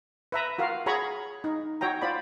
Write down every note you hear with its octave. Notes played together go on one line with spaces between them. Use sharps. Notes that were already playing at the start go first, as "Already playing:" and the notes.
B4 E5 A#5
F4 F#4 A#4 F5
F#4 G#4 C#5 A#5 B5 C#6
D#4
F#4 C#5 G5 A#5
F4 C5 D5 B5